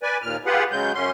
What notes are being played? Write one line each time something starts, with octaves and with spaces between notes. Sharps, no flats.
B4 D5 G#5
D#2 A#2 F6
F4 G4 G#4 B4 F#5
C#3 F#3 G#3 G6
F#2 C#4 C6